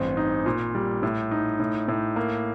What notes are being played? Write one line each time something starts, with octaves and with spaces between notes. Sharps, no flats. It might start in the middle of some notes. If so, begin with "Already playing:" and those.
Already playing: A1 G2 C4
D#4
A#2
G3
A2
D#4
A2
A2
A#3